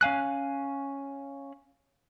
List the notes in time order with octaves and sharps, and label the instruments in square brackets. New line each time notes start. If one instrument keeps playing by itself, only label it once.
[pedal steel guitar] C#4 F5 G#5 F#6